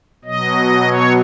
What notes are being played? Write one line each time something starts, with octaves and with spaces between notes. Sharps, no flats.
B2 F#3 D#5
C#5